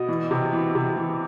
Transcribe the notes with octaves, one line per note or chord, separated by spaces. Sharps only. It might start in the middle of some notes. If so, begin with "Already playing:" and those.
Already playing: B2 D#5
E3
C3
E3
C3
E3